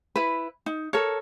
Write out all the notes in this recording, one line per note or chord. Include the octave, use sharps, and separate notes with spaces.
E4 B4
D#4
A4 A#4 C#5